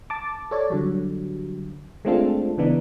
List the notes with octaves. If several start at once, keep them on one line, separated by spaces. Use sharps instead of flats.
A5 D6
A4 C#5 D5
D3 F#3 G3
G#3 A3 C4 D4 F4 A4
C#3 E3 B3 D4 D#4